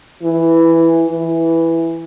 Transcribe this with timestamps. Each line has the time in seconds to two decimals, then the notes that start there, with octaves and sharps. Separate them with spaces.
0.23 E3
1.08 E3